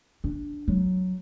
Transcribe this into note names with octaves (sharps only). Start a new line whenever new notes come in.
D4
F#3